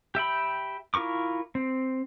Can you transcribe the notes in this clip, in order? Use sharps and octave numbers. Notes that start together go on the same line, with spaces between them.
G4 E5 G5 B5
E4 F4 A#4 C#6 D6
C4